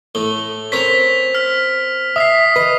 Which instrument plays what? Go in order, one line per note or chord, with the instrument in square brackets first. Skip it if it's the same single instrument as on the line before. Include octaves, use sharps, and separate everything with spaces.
[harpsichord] A2 A3 [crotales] G7
[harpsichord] C4 C#4 A#4 [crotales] B6 F7
[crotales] F6 B6
[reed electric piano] E5 [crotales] D#6 B6 C7
[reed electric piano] B4 [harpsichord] D#5